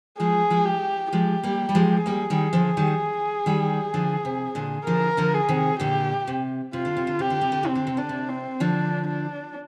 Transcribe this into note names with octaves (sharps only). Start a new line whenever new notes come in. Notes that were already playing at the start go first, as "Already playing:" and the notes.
F3 G#3 G#4
F3 G#3
G4
F3 G#3 G4
G3 A#3
G3
F3 G#3
G3 A#3 G#4
D#3 G3
D3 F3
D#3 G3
D#3 G3
D3 F3
C3
A#2 D3
D3 F3 A#4
D3 F3
G#4
C3 D#3
A#2 D3 G4
C3
C3 F4
D3
C3
D3
C3 G4
D3
C3
D3
C3 C4
D3
C3
D3 D4
C3
C4
D3 F3 D4
D4